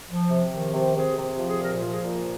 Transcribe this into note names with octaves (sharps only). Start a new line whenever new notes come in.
F3
C3
D#3
C3
C3 G#4
C3
F3
G#4
A#2 A#4
F3
G#4
A#2